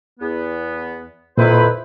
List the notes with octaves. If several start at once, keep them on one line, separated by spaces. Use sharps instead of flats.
E2 B3
F2 A#2 D#3 E4 B4 C5